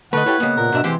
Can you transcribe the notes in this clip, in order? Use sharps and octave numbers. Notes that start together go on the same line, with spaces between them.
D3 A3 B4 D#5 F#5
E4 G4 A4 C#5
C#3 G#3 A#3 B3
A#2 A#4
G#2 B2 D4 E5
C3 E3 G#3 C4 G4